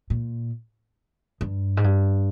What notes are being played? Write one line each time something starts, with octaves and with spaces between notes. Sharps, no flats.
A#2
G2
G#2
G2